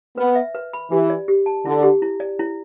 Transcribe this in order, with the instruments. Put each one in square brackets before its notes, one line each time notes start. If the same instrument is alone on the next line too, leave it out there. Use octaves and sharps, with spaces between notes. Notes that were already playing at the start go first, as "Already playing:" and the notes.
[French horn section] B3 [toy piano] B4
[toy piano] E5
B4
B5
[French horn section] E3 [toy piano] G4
[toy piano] D5
G4
A5
[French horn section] D3 [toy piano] E4
[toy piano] G4
E4
D5
E4